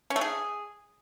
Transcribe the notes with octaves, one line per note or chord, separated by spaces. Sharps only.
C#4
A3
G#4